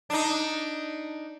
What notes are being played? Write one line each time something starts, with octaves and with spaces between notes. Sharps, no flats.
D4 D#4